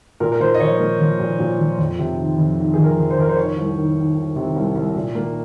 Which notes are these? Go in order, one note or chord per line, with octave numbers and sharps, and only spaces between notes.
A#2 A#4
A#4
A#2 C5
D#5
F3 C#5
A#3
F3
A#2
A#2
F3
F2
C3
D#3
F2
D#3
F2 G#4
A#4
F2
C5
F2 A#4
C5
D#3 C#5
C2
D#3
D#3
D#3
C3
C2
C2
A#2
A#3